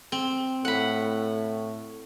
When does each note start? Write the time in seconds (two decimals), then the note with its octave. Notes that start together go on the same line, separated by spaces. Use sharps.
0.12 C4
0.65 A2 F#5 B5